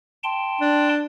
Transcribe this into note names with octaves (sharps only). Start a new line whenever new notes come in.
G5 A5 C6
D4